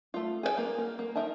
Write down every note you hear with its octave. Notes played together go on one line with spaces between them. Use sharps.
A3 F4
G#4 A4 G5
A#3
A#4
A#3
D#4 A#4 E5 A5